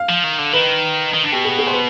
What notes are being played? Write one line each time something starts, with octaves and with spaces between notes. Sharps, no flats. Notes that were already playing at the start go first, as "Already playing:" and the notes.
Already playing: F5
F3
D#3
D3
D#3 B4
D#3
D3
B2 G4
G#4
G#4
C5
B4